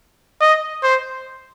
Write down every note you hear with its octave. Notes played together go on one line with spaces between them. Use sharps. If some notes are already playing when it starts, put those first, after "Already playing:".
D#5
C5